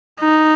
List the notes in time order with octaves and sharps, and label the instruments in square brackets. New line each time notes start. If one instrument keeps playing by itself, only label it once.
[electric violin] D#4